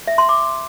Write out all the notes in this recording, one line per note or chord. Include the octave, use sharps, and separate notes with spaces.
E5
C6
D6